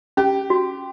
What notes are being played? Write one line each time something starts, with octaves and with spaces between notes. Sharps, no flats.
C#4 G4
F#4